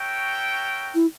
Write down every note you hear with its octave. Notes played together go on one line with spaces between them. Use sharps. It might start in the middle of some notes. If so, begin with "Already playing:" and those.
Already playing: F#4 A#4 C#5 E5 G5
E4